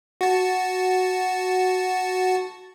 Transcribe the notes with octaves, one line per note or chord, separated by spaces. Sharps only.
F#4 A5